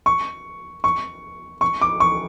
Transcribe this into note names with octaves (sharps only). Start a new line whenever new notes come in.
C#6
C#6
C#6
D6
C#6